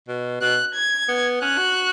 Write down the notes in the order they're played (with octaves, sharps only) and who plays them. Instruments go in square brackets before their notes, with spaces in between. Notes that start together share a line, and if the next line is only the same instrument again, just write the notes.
[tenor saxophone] B2
[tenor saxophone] B2 [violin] F#6
[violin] G#6
[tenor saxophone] B3
[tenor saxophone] C#4 [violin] F#6
[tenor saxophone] F#4